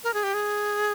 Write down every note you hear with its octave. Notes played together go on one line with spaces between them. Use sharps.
A#4
G#4
G4
G#4